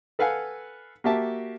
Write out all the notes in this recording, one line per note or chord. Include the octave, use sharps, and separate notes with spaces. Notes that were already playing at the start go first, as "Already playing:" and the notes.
A4 B4 F5 F#5 G#5
A#3 F#4 G4 E5 A5